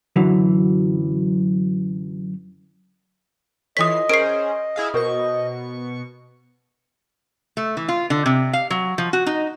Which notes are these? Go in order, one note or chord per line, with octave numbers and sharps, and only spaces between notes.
F#2 D3 E3 F#3
E3 F4 A4 C#5 D#5 D#6 B6 C7
C#4 G#4 A#4 C5 C7 D7
E4 G#4 F5
B2 F#4 A#4 C5 C#6
A3
E3
F4
D3
C3
F5
F#3
F3
F#4
D#4